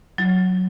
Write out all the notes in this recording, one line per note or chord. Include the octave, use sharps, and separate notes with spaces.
F#3